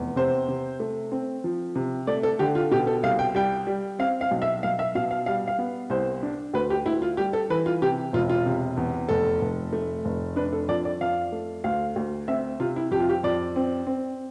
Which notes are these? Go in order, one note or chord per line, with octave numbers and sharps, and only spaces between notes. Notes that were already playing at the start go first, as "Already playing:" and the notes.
Already playing: F1 E2
C3 C5
C3
A3
C4
F3
C3
A3 D5
A4
D3 G4
F4
B2 G4
A4
C2 F5
G5
G3 G5
G3
C4 F5
F5
B1
E5
B1 F5
E5
B2 F5
F5
G3 F5
F5
B3
C2 C5
D4
D2 B4
G4
D2 E4
F4
G3 G4
A4
E3 B4
F4
C3 G4
E1 F4
F4
C3
E2
F1 A4
F1
A3
F1
D4 B4
A4
F2 D5
D5
F2 F5
A3
D2 F5
D2
C4 E5
C3 F4
E4
F2 G4
F4
G4
F2 D5
C4
C4